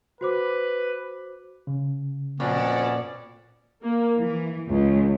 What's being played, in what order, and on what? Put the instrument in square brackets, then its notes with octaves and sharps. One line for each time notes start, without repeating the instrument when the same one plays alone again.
[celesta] F#4 C5 D6 [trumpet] B4
[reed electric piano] C#3
[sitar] F2 [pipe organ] A#2 D5 [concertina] B3 C#4 F#4
[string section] A#3
E3
C#2